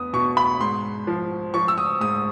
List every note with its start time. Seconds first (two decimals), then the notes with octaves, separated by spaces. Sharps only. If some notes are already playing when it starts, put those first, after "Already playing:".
Already playing: E2 B3 D#6
0.13 B2 C#6
0.37 B5
0.60 G#2 C6
1.07 F3
1.54 F3 C#6
1.68 E6
1.78 D#6
2.01 G#2 D#6